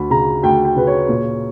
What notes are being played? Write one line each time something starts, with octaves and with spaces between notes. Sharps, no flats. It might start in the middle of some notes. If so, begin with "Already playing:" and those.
Already playing: D2 B5
C#3 A#5
D2 G5
G5
C#3 B4
C#5
A#2